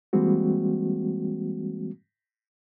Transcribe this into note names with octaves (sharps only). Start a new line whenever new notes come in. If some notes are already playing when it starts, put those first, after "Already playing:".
E3 G3 G#3 A#3 C4 F#4